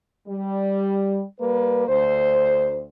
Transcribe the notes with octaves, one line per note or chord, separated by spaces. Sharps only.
G3
G3 A#3 B4
D2 C5